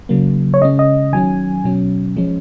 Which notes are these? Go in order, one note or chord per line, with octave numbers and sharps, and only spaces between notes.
C#3 F#3 A#3
C#5
C#3 G#3 C#4 D#5
D#5
D#3 F#3 C#4 G#5
B2 F#3 C#4
F3 G#3 C#4